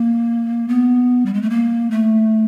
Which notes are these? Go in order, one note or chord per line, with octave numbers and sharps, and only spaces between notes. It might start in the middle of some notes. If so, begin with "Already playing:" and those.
Already playing: A#3
B3
G3
G#3
A3
A#3
A3